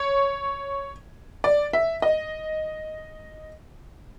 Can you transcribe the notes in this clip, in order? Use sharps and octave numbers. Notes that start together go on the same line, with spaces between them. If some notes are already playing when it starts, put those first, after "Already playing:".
Already playing: C#5
D5
E5
D#5